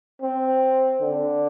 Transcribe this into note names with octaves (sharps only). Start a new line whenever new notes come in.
C4
D3